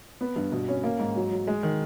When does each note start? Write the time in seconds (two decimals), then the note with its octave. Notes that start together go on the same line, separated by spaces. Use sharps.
0.21 B3
0.36 G2
0.52 B2
0.68 C#4
0.84 A#3
0.99 G#2
1.16 F#3
1.31 F#3
1.47 G#3
1.63 D#3